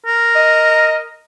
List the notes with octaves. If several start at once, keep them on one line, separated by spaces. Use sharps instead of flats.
A#4
D#5